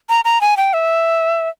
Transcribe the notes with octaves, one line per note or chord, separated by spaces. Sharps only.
A#5
A#5
G#5
G5
E5